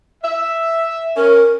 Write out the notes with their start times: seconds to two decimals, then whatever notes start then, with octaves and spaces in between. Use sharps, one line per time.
0.23 E5
1.16 C#4 A#4